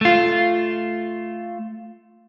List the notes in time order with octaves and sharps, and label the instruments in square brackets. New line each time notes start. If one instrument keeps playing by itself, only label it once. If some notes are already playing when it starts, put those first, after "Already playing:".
[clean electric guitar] A3 F4